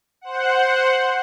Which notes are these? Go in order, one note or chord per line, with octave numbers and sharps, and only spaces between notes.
C5 F#5